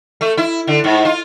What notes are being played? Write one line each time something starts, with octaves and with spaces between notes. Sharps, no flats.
A3
E4
D3
G#2
F4